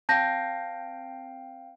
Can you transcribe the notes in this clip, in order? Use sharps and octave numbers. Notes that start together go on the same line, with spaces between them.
C4 F5 G5 A5 G6 A#6